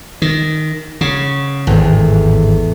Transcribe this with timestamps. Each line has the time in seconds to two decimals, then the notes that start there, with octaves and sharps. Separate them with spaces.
0.22 D#3
1.01 C#3 F#5 B5 C#6
1.67 G#1 E2 A2 G#3